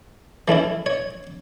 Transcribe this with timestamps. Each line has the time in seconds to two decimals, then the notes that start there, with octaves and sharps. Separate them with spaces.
0.48 E3 A3 C#4 E4
0.86 C#5